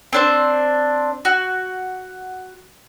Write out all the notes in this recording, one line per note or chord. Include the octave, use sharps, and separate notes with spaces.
C4 D4 C5
F#4